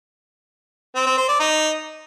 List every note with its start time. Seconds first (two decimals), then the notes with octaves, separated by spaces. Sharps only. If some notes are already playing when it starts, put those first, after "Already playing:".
0.95 C4
1.06 C4
1.17 C5
1.28 D5
1.39 D#4